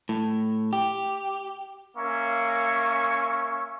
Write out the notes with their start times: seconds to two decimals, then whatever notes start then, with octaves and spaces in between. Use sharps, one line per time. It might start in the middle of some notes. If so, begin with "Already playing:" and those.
0.09 A2
0.73 G4
1.97 A#3 C#4 E5 G#5 C#6